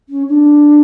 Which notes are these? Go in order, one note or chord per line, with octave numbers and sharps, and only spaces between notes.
C#4
D4